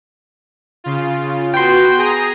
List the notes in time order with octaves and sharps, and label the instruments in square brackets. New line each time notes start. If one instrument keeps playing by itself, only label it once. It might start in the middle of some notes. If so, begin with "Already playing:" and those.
[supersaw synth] C#3 F4
[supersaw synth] B3 F#4 [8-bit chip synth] G5 C6
[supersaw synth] G#4 A#5 D#6